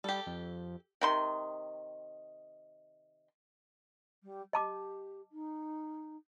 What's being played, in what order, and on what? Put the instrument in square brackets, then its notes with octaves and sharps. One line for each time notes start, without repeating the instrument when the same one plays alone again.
[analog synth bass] G3 [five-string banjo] G4 A4
[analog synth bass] F2
[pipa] C3 D#3 C6
[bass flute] G3
[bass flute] G4 [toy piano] D#5 A5 D6
[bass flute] D#4